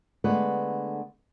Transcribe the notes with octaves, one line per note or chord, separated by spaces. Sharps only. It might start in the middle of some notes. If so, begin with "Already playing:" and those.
D3 G#3 A3 B3 B4